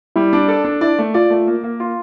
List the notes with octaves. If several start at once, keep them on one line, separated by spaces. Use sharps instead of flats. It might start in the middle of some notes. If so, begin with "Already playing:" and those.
G3 E4
D4
A4
D4
E4 D5
A3
F4 D5
A3
A#3
A#3
F4